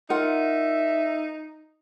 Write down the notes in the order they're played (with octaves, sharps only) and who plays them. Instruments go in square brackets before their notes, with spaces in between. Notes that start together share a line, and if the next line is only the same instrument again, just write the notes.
[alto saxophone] D#4 [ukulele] F4 A#4 F#5 [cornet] E5